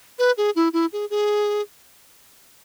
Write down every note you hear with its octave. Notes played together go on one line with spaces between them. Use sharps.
B4
G#4
E4
E4
G#4
G#4